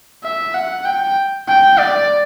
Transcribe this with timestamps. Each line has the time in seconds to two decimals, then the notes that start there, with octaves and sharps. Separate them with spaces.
0.24 E5
0.54 F#5
0.85 G5
1.48 G5
1.79 D5